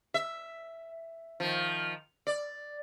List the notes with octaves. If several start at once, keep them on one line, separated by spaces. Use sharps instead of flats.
E5
D#3 F3
D5